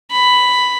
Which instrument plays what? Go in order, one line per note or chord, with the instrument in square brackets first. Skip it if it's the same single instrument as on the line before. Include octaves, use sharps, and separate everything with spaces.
[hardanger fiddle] B5